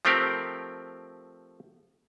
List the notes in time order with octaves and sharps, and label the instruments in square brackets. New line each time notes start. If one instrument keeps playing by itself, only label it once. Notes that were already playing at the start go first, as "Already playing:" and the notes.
[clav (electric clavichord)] F3 A3 C4 G4 A#4